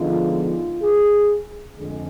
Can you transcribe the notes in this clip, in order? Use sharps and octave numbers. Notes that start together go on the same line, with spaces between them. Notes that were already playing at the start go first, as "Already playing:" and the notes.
Already playing: D3 F3 G#3 B3 D#4 F4
F4
G#4
F2 D3 G#3 G#4